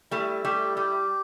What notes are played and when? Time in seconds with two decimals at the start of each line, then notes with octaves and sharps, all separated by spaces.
0.11 G3 A3 E4
0.44 G3 A3 G4
0.77 G3 G4